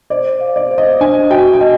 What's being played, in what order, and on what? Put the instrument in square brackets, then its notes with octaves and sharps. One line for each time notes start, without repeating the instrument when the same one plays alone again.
[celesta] C5 [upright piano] D5
[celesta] F5
[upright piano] D5
[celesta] C5
[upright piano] D#5
[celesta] D4 [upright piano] G#5
[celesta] F#4 [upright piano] G5
[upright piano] G5
[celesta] D#5 [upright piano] G#5